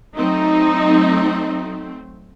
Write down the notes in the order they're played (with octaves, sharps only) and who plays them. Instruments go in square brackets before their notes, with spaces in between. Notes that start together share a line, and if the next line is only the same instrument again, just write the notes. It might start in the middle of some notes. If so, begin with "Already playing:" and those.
[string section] F#3 A3 C4 [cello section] D#4